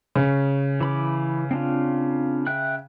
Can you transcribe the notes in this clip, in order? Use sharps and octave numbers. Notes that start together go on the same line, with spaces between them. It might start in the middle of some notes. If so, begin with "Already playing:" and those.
C#3
E3 B5 D6
C4 D4 F4
E5 G5 F#6